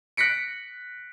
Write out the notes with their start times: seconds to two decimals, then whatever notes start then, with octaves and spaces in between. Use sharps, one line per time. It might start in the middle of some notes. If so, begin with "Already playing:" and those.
0.17 F#6 A#6 B6 C#7 D7